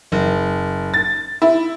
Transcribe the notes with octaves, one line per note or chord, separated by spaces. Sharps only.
F#1
A6
E4